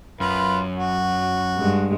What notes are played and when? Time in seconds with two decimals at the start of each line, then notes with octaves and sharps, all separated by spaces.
0.20 F#2 F4 B4
0.77 F#4
1.57 G2 G#3